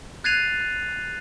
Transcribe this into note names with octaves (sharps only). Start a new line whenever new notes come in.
F#6 G#6 A6 C7 D#7 F7